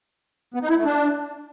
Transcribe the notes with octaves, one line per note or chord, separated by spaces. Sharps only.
B3
D#4
E4
A3
D4